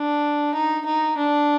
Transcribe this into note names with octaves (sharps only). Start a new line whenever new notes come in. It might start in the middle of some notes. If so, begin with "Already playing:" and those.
Already playing: D4
D#4
D#4
D4